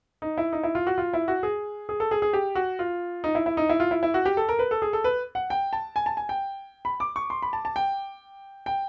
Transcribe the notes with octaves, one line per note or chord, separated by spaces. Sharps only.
D#4
E4
D#4
E4
F4
F#4
F4
E4
F#4
G#4
G#4
A4
G#4
G#4
G4
F#4
F4
D#4
E4
E4
D#4
E4
F4
E4
E4
F#4
G4
A4
A#4
B4
A4
G#4
A4
B4
F#5
G5
A5
G#5
A5
G#5
G5
B5
D6
C#6
C6
B5
A5
A5
G5
G5